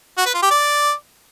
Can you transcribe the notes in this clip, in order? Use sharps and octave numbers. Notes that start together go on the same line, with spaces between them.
F#4
B4
F4
G4
D5